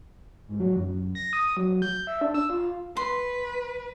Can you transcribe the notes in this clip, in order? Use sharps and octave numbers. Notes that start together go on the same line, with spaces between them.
G#2
F#3
F#2
A#6
D#6
F#3
G6
E5
D4
E6
F4
B4 C6